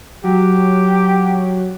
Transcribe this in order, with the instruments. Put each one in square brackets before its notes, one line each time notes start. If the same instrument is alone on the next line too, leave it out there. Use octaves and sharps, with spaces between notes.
[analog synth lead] F#3 [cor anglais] G4